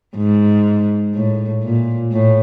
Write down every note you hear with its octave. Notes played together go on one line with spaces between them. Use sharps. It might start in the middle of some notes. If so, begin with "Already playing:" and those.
G#2
A2
A#2
A2